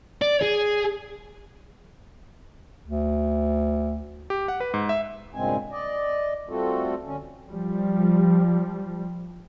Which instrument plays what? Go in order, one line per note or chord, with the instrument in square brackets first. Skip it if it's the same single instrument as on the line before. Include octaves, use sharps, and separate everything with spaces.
[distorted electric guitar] D5
G#4
[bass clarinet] D2
[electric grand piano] G4
F#5
B4
G#2
E5
[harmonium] G2 A#2 C#3 G#3 C4 G#5
D5 D#5
G3 A3 C4 F4 F#4 A4
D3 C#4
[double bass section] F3 G3